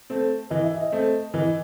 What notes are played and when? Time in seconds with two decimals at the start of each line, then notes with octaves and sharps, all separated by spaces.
0.10 A3 C4
0.50 E3 D#5
0.64 E5
0.77 D#5
0.92 A3 C4
1.34 E3 D#5